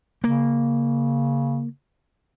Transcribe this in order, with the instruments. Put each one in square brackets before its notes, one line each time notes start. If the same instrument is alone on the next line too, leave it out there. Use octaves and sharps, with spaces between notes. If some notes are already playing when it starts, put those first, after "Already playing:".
[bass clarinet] C#3 [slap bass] A#3